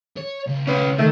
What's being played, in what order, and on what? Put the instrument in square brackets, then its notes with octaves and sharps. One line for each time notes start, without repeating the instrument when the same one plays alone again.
[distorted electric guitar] C#5
C#2
[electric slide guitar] C#4 B4
[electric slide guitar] D#3 [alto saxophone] A3